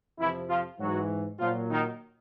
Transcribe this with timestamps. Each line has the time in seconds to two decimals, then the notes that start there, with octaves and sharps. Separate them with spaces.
0.18 F2 C3 E3 F3 E4
0.49 F3 F4
0.79 G#2 E3 F#3 F#4
1.39 A#2 F3 F#3 F4
1.70 D#3 D#4